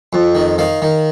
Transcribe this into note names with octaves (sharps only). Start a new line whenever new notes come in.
F2
D#3
D#3 F5
D#3